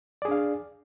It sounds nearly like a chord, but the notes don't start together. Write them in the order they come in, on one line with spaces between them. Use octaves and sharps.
D5 G#4 D4 F5